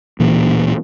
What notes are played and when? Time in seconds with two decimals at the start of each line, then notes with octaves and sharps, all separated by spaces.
0.19 D1 A#2 E3